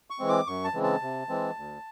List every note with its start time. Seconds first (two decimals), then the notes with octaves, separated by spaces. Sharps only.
0.10 C#6
0.19 E3 G#3 C4
0.29 D6
0.46 F#2 C#6
0.64 A5
0.74 C#3 E3 G#3 C4
0.83 A5
1.02 C3
1.29 E3 G#3 C4
1.56 D2